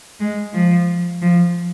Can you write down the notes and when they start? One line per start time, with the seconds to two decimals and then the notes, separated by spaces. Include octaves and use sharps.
0.20 G#3
0.54 F3
1.22 F3